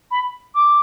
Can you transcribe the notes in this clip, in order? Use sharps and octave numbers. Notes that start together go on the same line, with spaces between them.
B5
D6